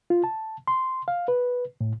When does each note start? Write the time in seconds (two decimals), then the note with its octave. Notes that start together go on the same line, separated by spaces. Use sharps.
0.10 F4
0.24 A5
0.68 C6
1.08 F5
1.28 B4
1.81 A2